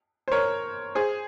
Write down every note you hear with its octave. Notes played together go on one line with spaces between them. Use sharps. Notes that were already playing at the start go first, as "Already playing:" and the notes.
C5
A#4 C#5
G#4 C5